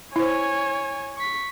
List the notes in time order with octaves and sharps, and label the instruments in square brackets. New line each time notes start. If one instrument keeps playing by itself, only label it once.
[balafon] E4 C5 [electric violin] C#5 G#5
[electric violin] C#6 B6